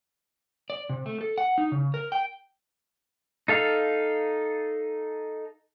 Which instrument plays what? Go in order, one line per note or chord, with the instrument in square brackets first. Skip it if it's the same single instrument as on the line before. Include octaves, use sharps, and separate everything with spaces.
[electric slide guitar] D5
C3
A3
A4
F#5
D#4
C#3
A#4
G5
[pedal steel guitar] D#4 A4 F5